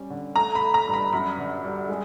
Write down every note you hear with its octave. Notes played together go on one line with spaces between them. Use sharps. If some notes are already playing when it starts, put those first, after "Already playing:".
Already playing: G3 C#4
D3
A3 A#5
B5
A3
A#5
G2
B5
F#2 B5
D3
G3
G#3